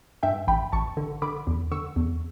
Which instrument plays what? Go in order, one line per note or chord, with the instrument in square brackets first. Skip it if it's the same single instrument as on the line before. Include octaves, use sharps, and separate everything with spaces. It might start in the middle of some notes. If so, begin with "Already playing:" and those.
[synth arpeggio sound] G2 E5 G5
A1 G5 B5
A1 A5 C#6
D3
D3 B5 D6
E2
D3 C#6 E6
E2